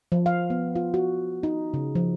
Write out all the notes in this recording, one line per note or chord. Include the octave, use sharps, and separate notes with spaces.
F3
F5
B3
F4
F#4
D#4
C#3
F3